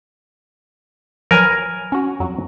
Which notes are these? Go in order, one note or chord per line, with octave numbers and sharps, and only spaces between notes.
F3 F#3 A#4 B4 G#5
C#4 F#4
F2 F#3